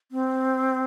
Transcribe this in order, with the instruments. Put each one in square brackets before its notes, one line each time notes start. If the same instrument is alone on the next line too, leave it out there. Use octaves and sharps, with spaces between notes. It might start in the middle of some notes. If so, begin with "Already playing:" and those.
[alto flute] C4